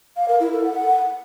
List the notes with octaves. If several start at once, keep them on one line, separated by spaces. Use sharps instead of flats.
F5
A#4
E4
A4
F#5